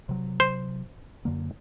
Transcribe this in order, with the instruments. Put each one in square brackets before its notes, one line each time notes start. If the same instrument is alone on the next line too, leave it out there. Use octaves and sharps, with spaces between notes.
[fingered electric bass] C3 F#3
[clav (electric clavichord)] C5
[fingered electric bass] F#2 D3 A#3